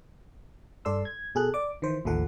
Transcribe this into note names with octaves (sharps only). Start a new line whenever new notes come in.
G2 A4 D5 C6 E6
G#6
B2 G#4 A4 F#6
D5 D6
D#3 E3 C5
A1 D#2 E3 F3 A4 F#5